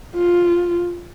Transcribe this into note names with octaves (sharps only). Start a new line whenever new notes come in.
F4